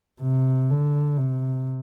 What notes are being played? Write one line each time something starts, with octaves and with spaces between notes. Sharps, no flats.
C3
D3
C3